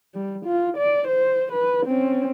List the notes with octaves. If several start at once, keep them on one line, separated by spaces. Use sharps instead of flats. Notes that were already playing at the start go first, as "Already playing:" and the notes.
G3
F4
D5
C5
B4
C4 C#4